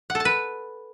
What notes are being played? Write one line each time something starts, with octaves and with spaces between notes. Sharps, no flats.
F#5
A4
A5
B4